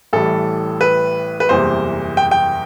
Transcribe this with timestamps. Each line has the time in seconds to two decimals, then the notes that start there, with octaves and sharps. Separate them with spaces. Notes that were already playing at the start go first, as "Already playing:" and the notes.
0.13 A1 A2 E3 G3 A4
0.81 B4
1.40 B4
1.49 F#1 E2 C3 G3 C5
2.17 G5
2.31 G5